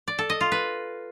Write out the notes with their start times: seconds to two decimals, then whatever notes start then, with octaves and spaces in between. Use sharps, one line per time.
0.08 D5
0.19 A4
0.30 D#5
0.41 F4
0.52 B4